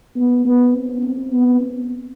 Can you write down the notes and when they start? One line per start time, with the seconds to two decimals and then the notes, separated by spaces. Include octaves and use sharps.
0.16 B3
0.45 B3
0.74 C4
1.03 C4
1.32 B3
1.61 C4